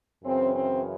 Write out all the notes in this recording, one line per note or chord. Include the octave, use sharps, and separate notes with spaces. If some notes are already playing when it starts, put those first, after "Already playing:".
F#2 C#3 E3 C4
C4